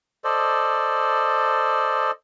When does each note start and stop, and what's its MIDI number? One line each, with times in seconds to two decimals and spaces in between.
0.24 2.11 69
0.24 2.11 72
0.24 2.11 74
0.24 2.11 75